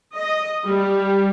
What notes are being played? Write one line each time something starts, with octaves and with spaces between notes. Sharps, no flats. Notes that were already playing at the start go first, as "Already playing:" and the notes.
D#5
G3